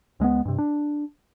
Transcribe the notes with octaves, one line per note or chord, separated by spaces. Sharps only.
C#2 G#3 A3 B3
G2 C3
D4